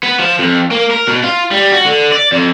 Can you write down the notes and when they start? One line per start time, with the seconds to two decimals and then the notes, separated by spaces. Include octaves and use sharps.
0.03 B3
0.19 F3
0.39 F2
0.71 A#3
0.91 A#4
1.08 B2
1.23 F4
1.51 G3
1.72 F#4
1.85 D3
2.12 D5
2.32 F2